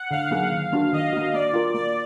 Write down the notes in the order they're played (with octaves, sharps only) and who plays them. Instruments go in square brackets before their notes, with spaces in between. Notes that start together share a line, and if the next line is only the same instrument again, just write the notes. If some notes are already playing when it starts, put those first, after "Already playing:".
Already playing: [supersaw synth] F#5
[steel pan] D3 [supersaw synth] F5
[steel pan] F#3 A#3 D#4 G#4
D#3
A#3 D4 F#4
[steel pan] D#3 [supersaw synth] D#5
[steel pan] A#3 D4 F#4
[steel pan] A#3 [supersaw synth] D5
[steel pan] F4 A#4
[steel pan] A#3 [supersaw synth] D5